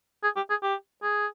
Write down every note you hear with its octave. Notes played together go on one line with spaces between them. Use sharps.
G#4
G4
G#4
G4
G#4